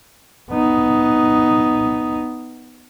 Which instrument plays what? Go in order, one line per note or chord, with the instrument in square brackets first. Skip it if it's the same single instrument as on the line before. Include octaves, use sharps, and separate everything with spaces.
[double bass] B3 D#4